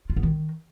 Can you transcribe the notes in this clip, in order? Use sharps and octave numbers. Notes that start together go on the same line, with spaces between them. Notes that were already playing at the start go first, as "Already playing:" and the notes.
F4
B3
D#3